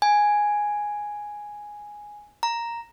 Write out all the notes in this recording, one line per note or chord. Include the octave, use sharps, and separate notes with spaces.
G#5
A#5